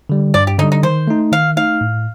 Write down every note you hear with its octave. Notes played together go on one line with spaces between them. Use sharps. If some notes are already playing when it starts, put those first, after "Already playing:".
D3 G3
G2 D5
G4
D3 G3 D#4
D#4
D#3 C5
A3 D#4
D#3 F5
A3 D#4 F5
A2